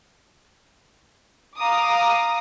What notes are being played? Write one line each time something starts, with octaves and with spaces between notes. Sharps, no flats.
F5 A#5 D6 D#6